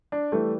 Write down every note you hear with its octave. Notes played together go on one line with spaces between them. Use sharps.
D4
E3 G3 A3